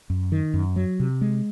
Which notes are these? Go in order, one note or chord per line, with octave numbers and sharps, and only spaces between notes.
F#2
D#3
F#2
F#3
C3
G#3